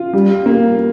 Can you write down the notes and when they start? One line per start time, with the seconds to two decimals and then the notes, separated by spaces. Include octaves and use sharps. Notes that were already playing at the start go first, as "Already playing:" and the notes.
Already playing: F4
0.13 G3
0.46 A#3